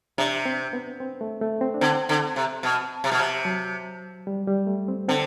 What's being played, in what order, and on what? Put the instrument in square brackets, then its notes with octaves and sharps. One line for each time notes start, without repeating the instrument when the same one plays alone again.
[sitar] C3 [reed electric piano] D4
[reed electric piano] C4
B3
C4
A3
A3
C4
D4
[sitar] D3 [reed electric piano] C4
[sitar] D3
C3
B2
C3
B2
C3
[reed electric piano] F#3
G3
G3
A3
C4
[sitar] D3 [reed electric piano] C4